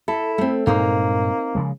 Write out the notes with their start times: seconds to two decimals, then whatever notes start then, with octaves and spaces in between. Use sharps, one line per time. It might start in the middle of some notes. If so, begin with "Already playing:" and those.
0.08 E4 A4
0.38 A3 C4
0.67 G2 A#2 G#3 A#3 C4 D#4
1.55 C#3 F3 G#3